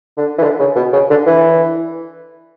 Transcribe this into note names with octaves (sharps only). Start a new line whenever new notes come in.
D3
E3
D3
C#3
B2
C#3
D3
E3